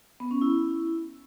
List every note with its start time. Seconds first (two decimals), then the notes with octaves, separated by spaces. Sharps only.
0.20 B3
0.31 C#4
0.42 E4